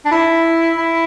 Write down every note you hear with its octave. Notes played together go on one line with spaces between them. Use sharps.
D4
E4
E4